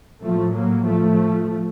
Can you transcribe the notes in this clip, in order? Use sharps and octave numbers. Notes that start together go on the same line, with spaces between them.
A2 F3 A3
F#3 A#3
F3 A3